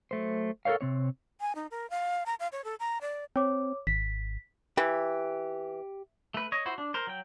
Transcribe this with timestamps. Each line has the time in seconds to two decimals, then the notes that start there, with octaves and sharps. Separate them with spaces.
0.11 F#3 A3 C5
0.65 A4 A#4 C5 C#5 F5
0.81 C3 C4 C#5
1.41 G#5
1.55 D#4
1.71 A#4
1.90 F5
2.26 A#5
2.40 F5
2.52 C#5
2.64 A4
2.80 A#5
3.01 D5
3.36 C4 C#5 D6
3.87 G#1 B6
4.77 E3 G4
6.34 A3 B4
6.52 C#5 D#5
6.66 E4 F#4 C5
6.78 D4
6.94 A#4 C5
7.07 F#3 G5